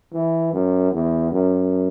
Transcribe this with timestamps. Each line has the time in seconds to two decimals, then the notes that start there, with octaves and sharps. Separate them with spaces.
0.13 E3
0.53 F#2
0.92 E2
1.31 F#2